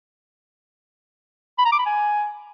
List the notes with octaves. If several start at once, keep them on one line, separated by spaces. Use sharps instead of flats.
B5
A#5
D6
B5
G#5